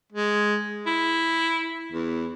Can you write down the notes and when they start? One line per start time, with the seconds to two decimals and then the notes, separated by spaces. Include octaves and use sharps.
0.12 G#3
0.87 E4
1.92 E2